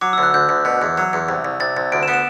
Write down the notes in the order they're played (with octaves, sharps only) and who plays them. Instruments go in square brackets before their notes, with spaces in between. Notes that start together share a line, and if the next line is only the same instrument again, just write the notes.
[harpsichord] F#3 [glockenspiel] D6
[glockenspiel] E6
[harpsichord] D2
[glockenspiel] F#6
[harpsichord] D2 [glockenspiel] G6
[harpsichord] D2
B2
E2
F#3
E2
C2
C2
[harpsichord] C2 [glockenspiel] A6
[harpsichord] C2
[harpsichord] D2 [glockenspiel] D7
[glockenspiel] E7
[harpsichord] B3
[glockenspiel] E7